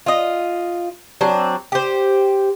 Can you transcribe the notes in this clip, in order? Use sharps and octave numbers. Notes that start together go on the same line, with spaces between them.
F4 D#5
F#3 C4 D4
G4 C5